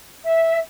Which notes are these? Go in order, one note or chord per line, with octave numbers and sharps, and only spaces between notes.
E5